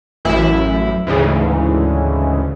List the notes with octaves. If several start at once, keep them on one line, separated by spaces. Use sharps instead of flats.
A1 F#2 E4
D2 G#2 C#3 E3